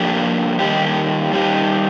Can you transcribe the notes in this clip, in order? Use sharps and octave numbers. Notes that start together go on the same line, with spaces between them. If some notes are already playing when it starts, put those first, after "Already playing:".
Already playing: F3 A#3 D4 G4
D#3 G3 A#3 D#4 G4
D#3 G3 A#3 D#4 G4